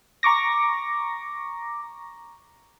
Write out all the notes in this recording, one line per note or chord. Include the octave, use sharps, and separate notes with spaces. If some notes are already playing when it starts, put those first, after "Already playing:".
A#5 C#6 D6 A#6